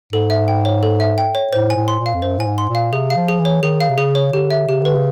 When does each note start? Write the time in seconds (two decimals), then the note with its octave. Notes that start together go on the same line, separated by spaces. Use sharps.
0.13 G#2 A4
0.30 E5
0.48 G5
0.65 C#5
0.83 A4
1.00 E5
1.18 G5
1.35 C#5
1.52 A2 C5
1.70 G#5
1.76 A2
1.88 C6
1.99 A#2
2.06 F5
2.14 F2
2.22 F#2 C5
2.38 A2 G#5
2.47 G#2
2.58 C6
2.70 A#2
2.75 F5
2.92 C3 G#4
3.10 F5
3.16 F3
3.28 G#4
3.39 E3
3.45 C#5
3.63 D#3 G#4
3.80 F5
3.89 C3
3.98 C#3 G#4
4.15 C#5
4.32 D3 G4
4.50 E5
4.68 C#3 G4
4.82 D3 B4
4.95 C#3